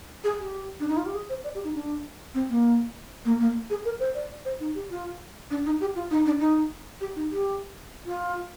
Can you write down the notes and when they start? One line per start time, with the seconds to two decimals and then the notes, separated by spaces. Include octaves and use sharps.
0.24 G#4
0.39 G4
0.80 D4
0.88 D#4
0.97 F4
1.06 G4
1.14 G#4
1.29 C5
1.44 D5
1.55 G4
1.64 D#4
1.74 D4
2.34 C4
2.49 A#3
3.25 A#3
3.40 A#3
3.70 G#4
3.85 A#4
4.00 C5
4.15 D5
4.45 C5
4.60 D#4
4.75 G4
4.90 F4
5.51 D4
5.66 D#4
5.81 G4
5.95 F4
6.11 D#4
6.26 D4
6.40 D#4
7.01 G4
7.16 D#4
7.31 G4
8.06 F4